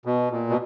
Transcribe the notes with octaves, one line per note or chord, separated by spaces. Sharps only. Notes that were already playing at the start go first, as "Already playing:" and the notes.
B2
A#2
B2